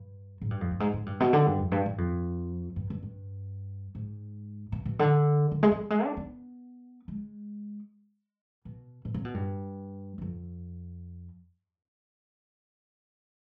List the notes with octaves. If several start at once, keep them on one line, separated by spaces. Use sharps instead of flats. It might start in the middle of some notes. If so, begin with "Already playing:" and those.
Already playing: G2
G#2
G2
F2
G2
G#2
G#2
G2
B2
D3
G2
F2
G2
G2
F2
G2
G2
G2
G#2
B2
B2
D3
D#3
G#3
G3
G#3
D4
B3
G#3
B2
B2
C3
B2
G2
G2
F2